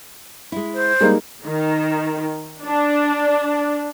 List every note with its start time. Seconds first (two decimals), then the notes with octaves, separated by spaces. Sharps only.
0.52 G#3 E4
0.74 C5
1.00 G3 G#3 A#3 D#4
1.45 D#3
2.64 D4